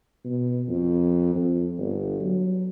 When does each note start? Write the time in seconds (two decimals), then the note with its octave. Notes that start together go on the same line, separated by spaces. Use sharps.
0.24 B2
0.68 F2
1.35 F2
1.78 G1
2.21 F#3